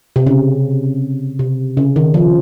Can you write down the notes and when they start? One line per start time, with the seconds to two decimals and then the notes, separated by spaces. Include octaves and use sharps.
0.16 C3
0.26 C#3
1.39 C3
1.77 C#3
1.96 D#3
2.14 F3